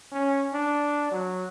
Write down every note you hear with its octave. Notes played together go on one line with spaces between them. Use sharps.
C#4
D4
F#3